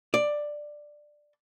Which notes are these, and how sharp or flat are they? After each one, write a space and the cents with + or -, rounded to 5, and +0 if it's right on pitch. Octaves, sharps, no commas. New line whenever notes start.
D5 +10